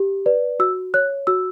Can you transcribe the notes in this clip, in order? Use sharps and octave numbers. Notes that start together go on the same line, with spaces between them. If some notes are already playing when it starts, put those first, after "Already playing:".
Already playing: G4
B4 D5
F#4 E6
C#5 F#6
F#4 E6